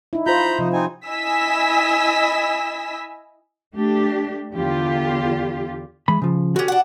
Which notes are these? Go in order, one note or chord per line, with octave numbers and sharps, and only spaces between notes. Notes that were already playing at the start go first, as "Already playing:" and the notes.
D#4 E4
F4 C5 A#5 B5 G6
C3 F3 D#4
C4 D#4 G#5
E4 D#5 G#5 E6 B6
A3 D4 G4
E2 D3 F4 G4
E3 G#3 B5
C#3 F3
D3 C#4 F#4 G4
D4 F#5